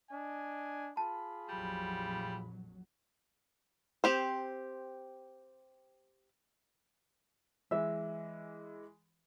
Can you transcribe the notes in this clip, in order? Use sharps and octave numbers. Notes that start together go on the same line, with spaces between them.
D4 D#5 G#5
F4 G#4 A5 B5
A#1 F2 F#3 G3
C4 G4 C5
E3 G#3 E5